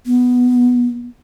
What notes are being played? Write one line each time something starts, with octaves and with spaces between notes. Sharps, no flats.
B3